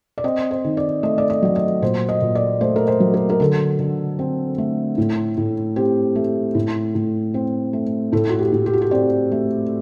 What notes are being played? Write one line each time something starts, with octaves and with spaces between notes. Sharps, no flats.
D5
C4 D#5
C5
D#3
D5
A3 D#5
D5
D#5
F#3 D5
D#5
A#2 C5
D#5
A#2
D5
A3 C5
A#4
C5
F#3
A#4
A#4
D3 A4
D3
C4
A3
A2
A2
C4 G4
A3
A2
A2
C4
A3
A2 A4
F#4
G4
A2
G4
F#4
G4
C4 D5
A3